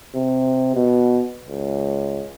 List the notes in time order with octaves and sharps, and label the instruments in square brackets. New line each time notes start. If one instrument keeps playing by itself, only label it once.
[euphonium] C3
B2
C#2